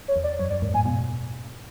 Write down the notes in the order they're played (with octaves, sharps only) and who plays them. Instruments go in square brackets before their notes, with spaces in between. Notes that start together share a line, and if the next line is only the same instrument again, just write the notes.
[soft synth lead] C#5
[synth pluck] E2
[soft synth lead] D5
[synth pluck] F#2 [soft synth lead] C#5
[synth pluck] F#2 [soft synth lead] D5
[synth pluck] E2 G#2
[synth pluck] F#2 A2 [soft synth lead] G#5
[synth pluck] G#2 B2